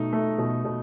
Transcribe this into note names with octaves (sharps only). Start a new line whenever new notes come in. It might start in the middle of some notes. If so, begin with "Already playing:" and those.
Already playing: B2 A3 D#4
A3
B2
B2